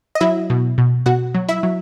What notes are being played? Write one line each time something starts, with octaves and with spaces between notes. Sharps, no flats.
D#5
F#3 E4 E5
B2
B2
B2 F#4 F#5
F#3
E4 E5
F#3